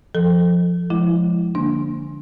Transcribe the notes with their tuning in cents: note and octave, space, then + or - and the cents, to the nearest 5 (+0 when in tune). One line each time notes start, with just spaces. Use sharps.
F3 +0 A4 +0
F3 +0 G#3 +5 E4 +0
D3 +0 A#3 +0 D4 +0